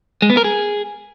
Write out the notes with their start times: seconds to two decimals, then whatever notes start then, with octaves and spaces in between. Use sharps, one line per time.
0.22 G#3
0.30 B3
0.37 A#4
0.44 G#4